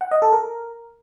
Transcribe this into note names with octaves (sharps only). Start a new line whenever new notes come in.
F#5
D#5
A4
A#4